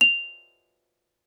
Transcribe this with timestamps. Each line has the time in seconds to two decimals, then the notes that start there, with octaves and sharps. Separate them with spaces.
0.01 F7